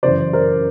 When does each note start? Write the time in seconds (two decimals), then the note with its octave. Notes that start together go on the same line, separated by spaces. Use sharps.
0.03 F#2 C#3 E3 C5 D5
0.33 A#4 C5